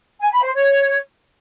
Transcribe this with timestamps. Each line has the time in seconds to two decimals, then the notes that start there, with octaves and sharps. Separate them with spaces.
0.21 G#5
0.32 B5
0.43 C5
0.54 C#5